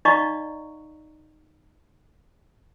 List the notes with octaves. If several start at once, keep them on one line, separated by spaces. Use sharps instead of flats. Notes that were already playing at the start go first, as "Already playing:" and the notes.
D#4 D5 D#5 F5 A#5 C#6